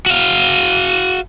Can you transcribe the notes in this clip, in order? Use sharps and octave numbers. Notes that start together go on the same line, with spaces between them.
F#4 F5